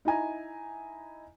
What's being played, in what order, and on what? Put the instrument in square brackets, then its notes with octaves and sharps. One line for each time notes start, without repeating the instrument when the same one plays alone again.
[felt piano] D#4 E4 G#5 A#5